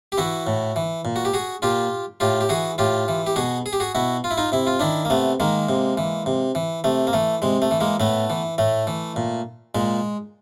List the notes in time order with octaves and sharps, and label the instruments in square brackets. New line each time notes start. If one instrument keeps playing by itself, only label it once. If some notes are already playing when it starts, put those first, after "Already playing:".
[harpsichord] G4
E3 E4 F#4
A2
E3
A#2
F#4
G4
F#4 G#4
A#2 F4 G4
A2 F4 G4
G4
E3 F#4 G#4
A2 F4 G4
E3
G4
B2 F#4 G#4
G#4
G4
F#4 G#4
B2 E4 F#4
F4
E4
D#4 F4
C3 E4
F4
D#3 D4 E4
A#3
C3 A3 B3
D#3 G#3 A#3
C3
E3
C3
E3
C3 A3
A#3
E3 A3
C3 G#3
A3
E3
G#3 A#3
A2 A3 B3
E3
A2 A3
E3
A#2
A#2 G#3